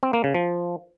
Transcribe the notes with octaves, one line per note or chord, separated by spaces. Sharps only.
C4
A#3
C#3
F3